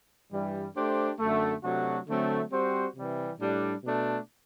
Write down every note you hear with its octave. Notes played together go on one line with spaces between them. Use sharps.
G2 E3 G3
A3 D4 G4 C5
F#2 D3 A3
C3 F#3 A3 D4 F#4
D3 F#3 A3 C4
G3 C4 F#4 C5
C3 E3 G3
A2 G3 D4
B2 A3 D4